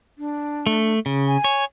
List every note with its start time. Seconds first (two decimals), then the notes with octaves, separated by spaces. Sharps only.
0.18 D4
0.67 A3
1.06 C#3
1.27 G#5
1.44 C#5